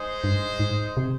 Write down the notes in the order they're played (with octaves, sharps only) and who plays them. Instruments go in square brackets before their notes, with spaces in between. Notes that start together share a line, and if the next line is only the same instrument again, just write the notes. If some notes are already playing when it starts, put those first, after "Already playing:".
Already playing: [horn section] G#3 D#4 G#4 C5 D#5
[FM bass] G2
G#2
C3